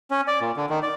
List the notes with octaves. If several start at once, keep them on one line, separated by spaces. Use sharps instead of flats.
C#4
D5
A#2
D3
D#3
D5